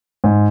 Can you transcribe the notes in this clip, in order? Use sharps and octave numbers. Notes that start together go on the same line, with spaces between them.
G#2